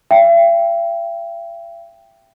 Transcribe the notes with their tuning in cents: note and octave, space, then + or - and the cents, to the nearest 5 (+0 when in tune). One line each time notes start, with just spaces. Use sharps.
E5 +45 G5 +0